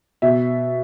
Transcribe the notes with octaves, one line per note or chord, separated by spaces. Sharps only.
B2 E5